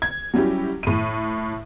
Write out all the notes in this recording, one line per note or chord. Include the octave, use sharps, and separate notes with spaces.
G#6
F#3 G3 C#4 E4 G4
A2 D#7